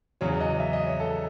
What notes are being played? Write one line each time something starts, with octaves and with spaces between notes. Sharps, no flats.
E2 C#3 F#3 C#5
D#5
E5
D#5
C#5
A4